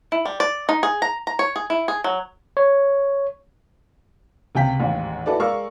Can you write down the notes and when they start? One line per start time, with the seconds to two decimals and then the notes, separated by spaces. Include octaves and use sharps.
0.12 E4
0.26 G3
0.40 D5
0.69 D#4
0.83 G#4
1.02 A#5
1.27 A#5
1.39 C#5
1.56 G#4
1.70 E4
1.88 G#4
2.04 F#3
2.57 C#5
4.55 C#2 C3 G5 B6
4.80 A1 D#2 G#2
5.26 E4 F#4 A4 B4 D5
5.40 G#3 A#4 D5 F5 C#6 E6